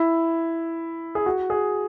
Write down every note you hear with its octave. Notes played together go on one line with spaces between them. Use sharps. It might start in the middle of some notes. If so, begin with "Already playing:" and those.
Already playing: E4
G#4
F#4
G#4